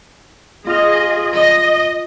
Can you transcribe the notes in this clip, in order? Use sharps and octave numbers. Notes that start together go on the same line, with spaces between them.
F4 G#4 D#5 F6
D#5